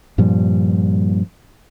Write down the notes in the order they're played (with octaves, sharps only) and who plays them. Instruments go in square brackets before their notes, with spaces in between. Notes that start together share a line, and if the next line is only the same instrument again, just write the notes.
[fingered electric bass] G2 A#2 F3 G3